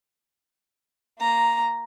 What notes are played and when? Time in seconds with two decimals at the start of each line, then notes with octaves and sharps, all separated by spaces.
1.19 A#3 A#5